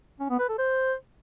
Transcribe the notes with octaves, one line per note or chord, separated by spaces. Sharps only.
C#4
B3
B4
A4
C5